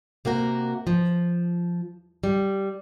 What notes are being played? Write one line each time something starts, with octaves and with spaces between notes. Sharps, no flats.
C3 A#3 F#4 A#4
F3
G3